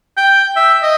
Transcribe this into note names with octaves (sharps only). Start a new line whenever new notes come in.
G5
E5
D#5